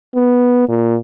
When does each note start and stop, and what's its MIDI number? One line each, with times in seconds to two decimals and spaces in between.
0.15 0.67 59
0.69 0.96 46